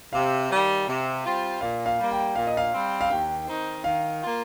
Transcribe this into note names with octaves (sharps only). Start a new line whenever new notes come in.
C3 F5
D#3 G3
C3
G3 C4 F4
A#2 F5
F5
G3 A#3
G5
A#2 F5
D#5
F5
G3 C4
F5
D#2 G5
D#3 C4 D#4
D#3 F5
A#3 F4